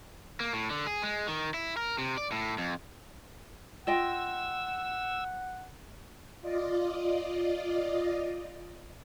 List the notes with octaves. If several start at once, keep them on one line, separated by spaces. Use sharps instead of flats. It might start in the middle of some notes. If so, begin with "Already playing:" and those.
A#3
A2
D3
G#4
G#3
D#3
E4
A#4
C3
D5
A2
F2
F4 D#5 F#5 G5 E6
F4 D5 D#5